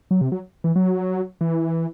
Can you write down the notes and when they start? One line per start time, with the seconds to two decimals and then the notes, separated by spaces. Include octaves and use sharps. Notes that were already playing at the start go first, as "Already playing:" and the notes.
0.11 F#3
0.21 C3
0.32 F#3
0.64 E3
0.76 F#3
1.41 E3